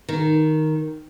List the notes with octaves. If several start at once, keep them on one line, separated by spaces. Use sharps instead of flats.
D#3